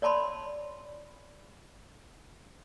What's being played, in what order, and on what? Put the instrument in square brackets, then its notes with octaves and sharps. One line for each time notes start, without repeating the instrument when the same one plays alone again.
[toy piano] C#5 D5 A5 B5 C6